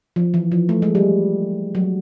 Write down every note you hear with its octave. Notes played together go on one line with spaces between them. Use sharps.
F3
E3
F3
A3
G#3
G3
F#3